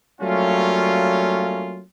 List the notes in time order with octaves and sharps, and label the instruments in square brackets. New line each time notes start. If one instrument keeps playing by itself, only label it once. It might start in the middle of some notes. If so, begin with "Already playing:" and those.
[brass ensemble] F#3 G3 A3 A#3 C#4 F4